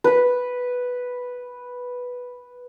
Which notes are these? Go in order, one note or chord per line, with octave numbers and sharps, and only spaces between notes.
B4 B5